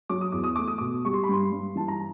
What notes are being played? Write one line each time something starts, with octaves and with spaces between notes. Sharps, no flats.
F#3 D6
D#6
E2 D6
D#6
A3 D6
D#6
B2 D6
G3 C#6
C6
B5
G2 C6
G2
E3 A5
A#5